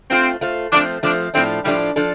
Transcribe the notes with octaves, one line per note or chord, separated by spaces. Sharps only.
A3 C4 F4 C5
A3 F4 C5
F3 A3 C4 D4
F3 A3 C4 D4
A2 F3 A3 C4 D4
A2 F3 G3 A3 D4
F3 D4 A4